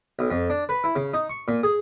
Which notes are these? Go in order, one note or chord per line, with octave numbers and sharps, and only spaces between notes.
B1
F2
D4
B4
E4
C#3
D#4
C#6
A#2
G#4